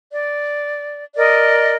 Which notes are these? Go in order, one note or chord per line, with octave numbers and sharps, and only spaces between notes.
D5
A#4 D5 D#5